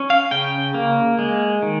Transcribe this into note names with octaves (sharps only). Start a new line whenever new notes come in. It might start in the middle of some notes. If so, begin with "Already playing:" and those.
Already playing: C#4
F5
C#3 G5
A#3
G#3
D#3